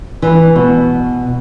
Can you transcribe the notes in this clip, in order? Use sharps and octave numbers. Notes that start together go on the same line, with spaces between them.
E3
B2